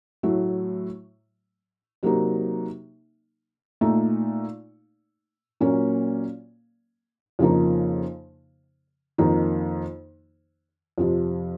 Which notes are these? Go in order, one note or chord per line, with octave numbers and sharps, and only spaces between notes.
A2 F#3 A3
C3 F#3 A#3 D#4
A#2 A3 D#4
A#2 F#3 A#3 C#4
F2 C#3 F3 A#3 D#4
F2 D#3 A#3 D#4
F2 C3 F3